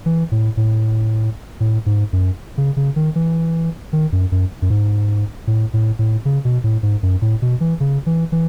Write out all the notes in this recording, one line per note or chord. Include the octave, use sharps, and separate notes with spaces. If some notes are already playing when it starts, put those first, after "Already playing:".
E3
A2
A2
A2
G#2
F#2
C#3
C#3
D#3
E3
D#3
F#2
F#2
F#2
G#2
A2
A2
A2
C#3
B2
A2
G#2
F#2
A2
B2
E3
C#3
E3
E3